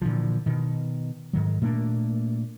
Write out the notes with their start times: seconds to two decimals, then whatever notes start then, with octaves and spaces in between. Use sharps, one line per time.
0.02 A#2 D3 E3 F3
0.46 B2 D#3
1.33 G#2 D#3 F#3
1.62 A#2 A3 A#3 D4